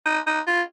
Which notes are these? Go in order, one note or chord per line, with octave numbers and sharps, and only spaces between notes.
D#4
D#4
F4